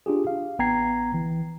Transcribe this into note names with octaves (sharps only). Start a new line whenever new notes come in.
D4 F4 G4 G#4
F5
A1 B3 G5 A#5 G#6 C7
E3